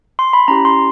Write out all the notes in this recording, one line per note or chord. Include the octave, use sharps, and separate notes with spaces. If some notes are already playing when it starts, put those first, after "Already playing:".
C6
B5
C#4 E4 G4 A#5
C6